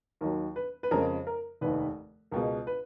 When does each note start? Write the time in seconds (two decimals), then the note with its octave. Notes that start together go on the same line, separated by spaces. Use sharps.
0.21 D#2 D#3 F#3 A#4
0.56 B4
0.83 B4
0.91 F2 C#3 G#3 A#4
1.27 A#4
1.61 F1 D#2 D#3 B4
2.31 C#2 B2 G#3 A#4
2.67 B4